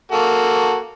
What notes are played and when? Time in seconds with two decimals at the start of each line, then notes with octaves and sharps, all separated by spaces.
0.12 A#3 F#4 A4